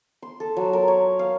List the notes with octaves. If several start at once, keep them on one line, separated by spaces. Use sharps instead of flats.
C6
A4
F#3
A#4
C#5
F5